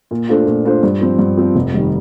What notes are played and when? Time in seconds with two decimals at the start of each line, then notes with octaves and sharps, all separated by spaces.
0.11 A#2
0.29 A3 D4 F4 C5
0.47 A#2
0.65 A3 D4 F4 C5
0.83 G2
1.01 F3 C4
1.19 G2
1.37 F3 C4
1.56 F1
1.74 D#3 G3